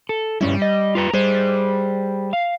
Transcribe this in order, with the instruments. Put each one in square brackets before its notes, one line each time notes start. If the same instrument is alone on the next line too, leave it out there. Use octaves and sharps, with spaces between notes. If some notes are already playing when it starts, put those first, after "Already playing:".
[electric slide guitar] A4
[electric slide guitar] G2 C#4 E4 [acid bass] G3
[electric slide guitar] D#5
F4 B4 A#5
[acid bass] G3 [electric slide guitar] G#4 C5
[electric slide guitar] F5